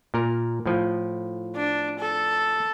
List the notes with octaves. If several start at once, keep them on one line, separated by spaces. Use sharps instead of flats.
A#2 A#4
A2 F3
D4
A4